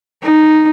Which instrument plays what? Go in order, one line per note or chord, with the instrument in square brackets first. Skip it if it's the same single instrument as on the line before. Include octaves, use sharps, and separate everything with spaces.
[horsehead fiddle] D#4